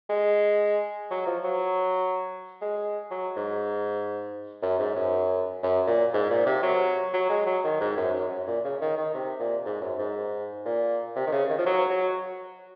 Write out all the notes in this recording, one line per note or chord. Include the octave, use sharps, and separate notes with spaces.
G#3
F#3
F3
F#3
G#3
F#3
G#2
F#2
G#2
F#2
F#2
A#2
G#2
A#2
C3
F#3
F#3
G#3
F#3
D#3
G#2
F#2
F#2
F#2
A#2
C#3
D#3
D#3
C3
A#2
G#2
F#2
G#2
A#2
C3
D#3
C#3
D#3
F3
F#3
F#3